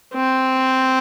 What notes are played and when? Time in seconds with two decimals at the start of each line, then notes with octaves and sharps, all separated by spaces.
0.15 C4